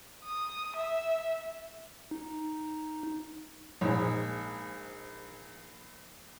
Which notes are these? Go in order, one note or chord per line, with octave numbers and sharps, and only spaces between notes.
D#6
E5
D#4
A#1 G#2